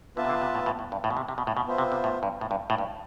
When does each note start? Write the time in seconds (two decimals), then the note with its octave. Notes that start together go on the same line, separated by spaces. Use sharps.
0.17 D3 B3 F4 B4 E5 A5
0.25 C3
0.30 D3
0.42 C3
0.55 A2
0.66 A2
0.79 A2
0.92 G2
1.04 A2
1.10 B2
1.17 C3
1.29 C3
1.38 B2
1.47 A2
1.57 B2
1.67 B3 F4 C5 E5
1.78 C3
1.92 C3
2.04 A2
2.23 G2
2.41 A2
2.51 G2
2.70 A2
2.78 G2